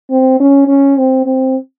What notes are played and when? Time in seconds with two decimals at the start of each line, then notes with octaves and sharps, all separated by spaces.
0.10 C4
0.40 C#4
0.68 C#4
0.97 C4
1.26 C4